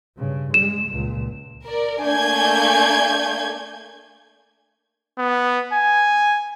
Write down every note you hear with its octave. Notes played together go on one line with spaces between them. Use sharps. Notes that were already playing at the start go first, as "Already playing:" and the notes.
G2 C#3
G#3 E7
C#2 A#2
A#4 D5
A3 A#3 D4 G#5 G6 G#6
B3
G#5